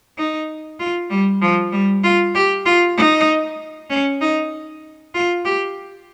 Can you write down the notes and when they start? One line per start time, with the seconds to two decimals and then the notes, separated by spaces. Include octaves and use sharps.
0.18 D#4
0.80 F4
1.11 G3
1.42 F3
1.73 G3
2.04 F4
2.35 G4
2.66 F4
2.97 D#4
3.90 C#4
4.21 D#4
5.14 F4
5.45 G4